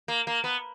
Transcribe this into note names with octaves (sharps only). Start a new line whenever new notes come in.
A#3
A#3
B3